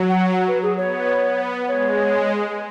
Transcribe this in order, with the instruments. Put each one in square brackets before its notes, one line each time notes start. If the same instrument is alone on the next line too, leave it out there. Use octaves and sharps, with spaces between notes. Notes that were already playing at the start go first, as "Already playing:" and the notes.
Already playing: [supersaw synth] F#3
[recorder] F#5
F#5
B4
G#4
[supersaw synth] B3 [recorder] C#5
[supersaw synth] B3
[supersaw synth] G#3 [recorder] C#5